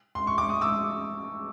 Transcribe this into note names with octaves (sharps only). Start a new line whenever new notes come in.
C6
C#6
D6
D#6
D6 E6